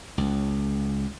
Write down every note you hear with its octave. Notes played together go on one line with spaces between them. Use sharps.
C#2